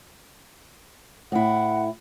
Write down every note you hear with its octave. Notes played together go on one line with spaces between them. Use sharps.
A2 E4 F#5